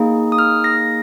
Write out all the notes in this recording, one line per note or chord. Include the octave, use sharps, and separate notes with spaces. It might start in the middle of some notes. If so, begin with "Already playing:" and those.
Already playing: A#3 D#4 G#4
D#6
F6
A#6